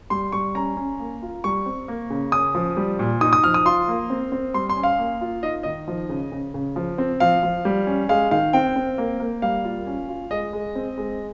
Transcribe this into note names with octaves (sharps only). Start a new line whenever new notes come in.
G3 C6
G3 C#6
C#4 A#5
C#4
A#3
F4
G3 C#6
C4
A#3
C#3
C#4 D#6
F3
G3
A#2
D#4 D#6
D#6
F3 F6
D#6
F4 C6
A#3
C4
C4
G3 C6
C6
C#4
F5
A#3
F4
D#4 D#5
D#3 D#5
F3
C#3
C#3
C#3
F3
C4
F3 F5
F3
G3
C#4
G#3 F5
D#3 F5
C4 G5
C4
A#3
A#3
G3 F5
F4
C#4
F4
G#3 D#5
G#3
C4
G#3